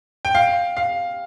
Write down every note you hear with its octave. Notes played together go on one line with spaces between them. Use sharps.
G5
F5
F5